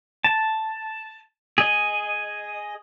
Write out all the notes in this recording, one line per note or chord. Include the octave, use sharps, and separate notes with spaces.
A5
G#4 D#5